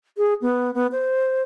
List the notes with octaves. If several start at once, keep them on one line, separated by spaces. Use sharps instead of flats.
G#4
B3
B3
C5